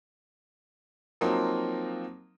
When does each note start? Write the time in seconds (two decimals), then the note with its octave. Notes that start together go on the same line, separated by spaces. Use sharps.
1.21 F3 F#3 A#3 C4 D#4